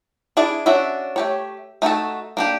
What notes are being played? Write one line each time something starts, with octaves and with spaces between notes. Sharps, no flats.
D4 E4 G#4 D5
C#4 D4 F#4 E5
A3 G4 C#5
A3 D#4 F#4 A4
A#3 D4 G4